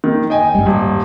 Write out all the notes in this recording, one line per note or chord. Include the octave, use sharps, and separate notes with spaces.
D#3
D#5 G5 G#5
G2 G3
D#1